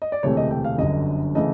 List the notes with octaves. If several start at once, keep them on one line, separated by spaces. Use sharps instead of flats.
D#5
D5
E1 D2 C3 E3 A3 C#5
D#5
G5
F5
G1 F#2 D3 D#5
C#3 E3 A3 D#5